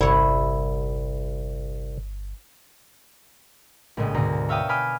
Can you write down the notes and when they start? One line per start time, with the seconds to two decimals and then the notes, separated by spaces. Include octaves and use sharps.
0.01 G1 C2 E4 C#5
3.97 A#1 A2 C#3 G#3 D#5
4.14 D2 G#2 B2 A#5
4.49 C#5 E5 F5 G5 D#6
4.69 G#5 B5 D6 D#6 F6 G6